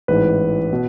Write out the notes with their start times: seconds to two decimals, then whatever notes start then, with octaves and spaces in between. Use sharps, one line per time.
0.08 A1 G#2 E3 B4
0.73 B2